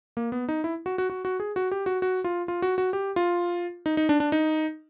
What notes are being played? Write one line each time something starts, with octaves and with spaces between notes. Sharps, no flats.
A#3
B3
D#4
E4
F#4
F#4
F#4
F#4
G#4
F#4
G4
F#4
F#4
F4
F4
F#4
F#4
G4
F4
D#4
D#4
D4
D4
D#4